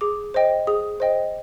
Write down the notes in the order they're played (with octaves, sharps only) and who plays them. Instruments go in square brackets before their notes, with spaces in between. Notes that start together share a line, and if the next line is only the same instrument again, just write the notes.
[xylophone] G#4 D6
C5 D#5 G5
G#4 D#6
C5 D#5 G5